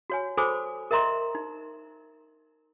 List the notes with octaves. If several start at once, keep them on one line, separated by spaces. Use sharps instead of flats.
F#4 C#5 G#5
F#4 A4 C5 G#5 B5 D6
A#4 D#5 E5 A#5 C6
D#4